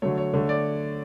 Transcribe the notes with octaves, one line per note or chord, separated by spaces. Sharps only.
D3 F#3 A3 C#5
C#5
D3 A3 C#5
D5